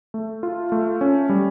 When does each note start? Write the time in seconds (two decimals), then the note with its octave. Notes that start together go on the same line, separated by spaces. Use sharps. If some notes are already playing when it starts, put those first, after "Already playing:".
0.14 A3
0.43 F4
0.72 A3
1.01 C#4
1.29 G3